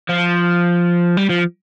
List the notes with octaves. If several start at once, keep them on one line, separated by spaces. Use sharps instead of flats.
F3
G3
F3